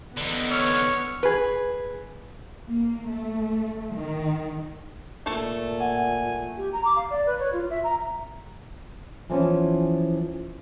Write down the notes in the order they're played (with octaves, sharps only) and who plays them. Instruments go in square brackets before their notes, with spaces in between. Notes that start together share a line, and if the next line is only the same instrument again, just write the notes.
[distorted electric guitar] D3 D#4 [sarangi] B3
[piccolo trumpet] C#5 [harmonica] E6 F6
[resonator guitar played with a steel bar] G#4 B4
[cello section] A#3
A3
D#3
[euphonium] A#2 [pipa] A3 A4
[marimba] F#5 [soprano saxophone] G#5
[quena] G4
A#5
D6
F5
D5
B4
C#5
F4
E5
A#5
[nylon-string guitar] E3 F3 B3 C#4